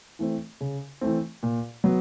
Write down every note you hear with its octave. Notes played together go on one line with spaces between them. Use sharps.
E3 A3 C4
C#3
E3 A3 C4
A#2
F#3 B3